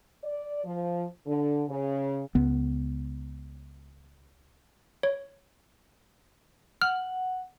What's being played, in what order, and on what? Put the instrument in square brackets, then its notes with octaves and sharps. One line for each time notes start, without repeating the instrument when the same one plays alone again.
[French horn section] D5
F3
D3
C#3
[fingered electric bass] C#2 B3
[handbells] C#5
[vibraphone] F#5 [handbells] F6